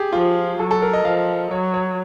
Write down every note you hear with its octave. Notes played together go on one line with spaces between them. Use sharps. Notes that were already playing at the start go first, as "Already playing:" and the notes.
Already playing: G4 G#4
F3 F4
F#3 A4
A4
A#4
D#5
F3 F5
F#3 C#5
C#5